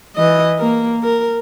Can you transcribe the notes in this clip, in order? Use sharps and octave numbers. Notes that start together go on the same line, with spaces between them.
E3 D#5
A#3 A#4
A#4